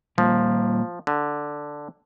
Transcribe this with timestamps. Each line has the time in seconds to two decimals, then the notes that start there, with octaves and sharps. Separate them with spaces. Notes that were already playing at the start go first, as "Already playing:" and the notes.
0.18 A#2 F3 G3 A#3
1.07 D3